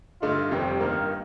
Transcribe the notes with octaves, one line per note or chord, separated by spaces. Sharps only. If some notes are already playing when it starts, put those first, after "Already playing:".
G2 D3 A3 D#4 F4
F1 F2 D#3 G3 C4 G4
G1 G2 D#3 A#3 A#4